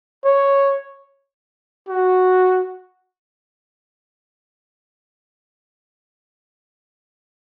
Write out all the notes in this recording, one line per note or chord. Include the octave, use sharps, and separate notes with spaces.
C#5
F#4